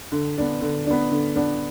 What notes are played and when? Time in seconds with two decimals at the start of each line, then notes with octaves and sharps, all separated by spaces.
0.12 D3
0.38 B3 D4
0.61 D3
0.86 B3 D4
1.11 D3
1.36 B3 D4